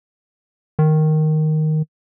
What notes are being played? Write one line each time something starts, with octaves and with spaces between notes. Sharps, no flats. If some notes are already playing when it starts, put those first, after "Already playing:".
D#3